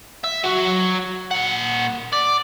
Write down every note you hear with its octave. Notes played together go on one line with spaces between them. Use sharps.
E5
F#3 F#4
A#2 F#5
D5